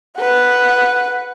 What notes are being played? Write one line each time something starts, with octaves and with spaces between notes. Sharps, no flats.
B4 F#5